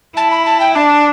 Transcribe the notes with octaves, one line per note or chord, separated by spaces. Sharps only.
E4 A5
B5
A5
G5
D4 A5